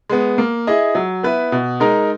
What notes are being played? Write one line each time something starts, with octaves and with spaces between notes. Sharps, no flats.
G#3 B3
A#3
E4 G#4 D#5
F#3
B3 E4 B4
B2
G#3 D#4 A#4